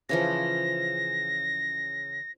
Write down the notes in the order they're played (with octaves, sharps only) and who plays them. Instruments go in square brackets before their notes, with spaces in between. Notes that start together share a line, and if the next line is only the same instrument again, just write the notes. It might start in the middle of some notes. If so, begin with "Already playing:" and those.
[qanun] C#3 E3 F3 [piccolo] A#6